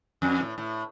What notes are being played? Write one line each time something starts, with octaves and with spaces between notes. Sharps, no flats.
F2
A2
A2